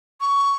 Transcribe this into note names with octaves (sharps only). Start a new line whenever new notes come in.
C#6